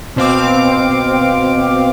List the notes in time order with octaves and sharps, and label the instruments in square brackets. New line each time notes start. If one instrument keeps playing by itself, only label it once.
[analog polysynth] B2 C4 F5 D6